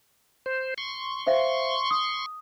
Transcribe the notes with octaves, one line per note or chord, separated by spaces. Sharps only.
C5
C6 C#6
C5 E5 F5
D#6